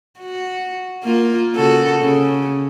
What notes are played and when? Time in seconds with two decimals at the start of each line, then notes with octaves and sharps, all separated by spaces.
0.19 F#4
1.04 A#3 F4
1.56 C#3 F#4 A4
2.02 C#3